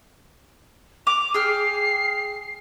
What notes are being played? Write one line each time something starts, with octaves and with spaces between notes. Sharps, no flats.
D6 F7
G#4 G5 F6 C7